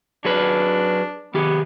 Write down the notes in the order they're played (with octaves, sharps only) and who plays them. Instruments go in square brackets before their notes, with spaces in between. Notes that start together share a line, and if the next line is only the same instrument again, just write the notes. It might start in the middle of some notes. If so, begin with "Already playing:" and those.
[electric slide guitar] F#3 G#4 B4 [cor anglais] D4
[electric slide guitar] D#3 G4 G#4 [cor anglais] B3